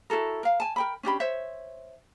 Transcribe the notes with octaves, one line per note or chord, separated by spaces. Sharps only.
E4 F#4 A4 A#4
A#4 F5
G#5 A5
A#4 G5 B5
C#4 D4 G4 B5
C5 C#5 E5